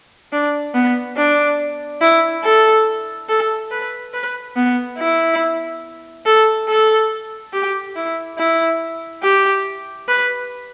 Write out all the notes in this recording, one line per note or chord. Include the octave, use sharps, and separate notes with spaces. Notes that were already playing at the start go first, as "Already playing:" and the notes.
D4
B3
D4
E4
A4
A4
B4
B4
B3
E4
A4
A4
G4
E4
E4
G4
B4